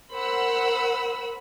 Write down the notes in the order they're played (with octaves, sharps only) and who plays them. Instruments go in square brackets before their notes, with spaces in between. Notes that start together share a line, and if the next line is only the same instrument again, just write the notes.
[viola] A#4 B5 [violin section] C5 F#5 E6